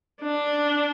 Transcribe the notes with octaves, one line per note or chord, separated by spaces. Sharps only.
D4